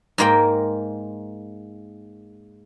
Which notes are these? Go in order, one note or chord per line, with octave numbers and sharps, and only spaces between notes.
G#2 G#3 A#3 A#4 G5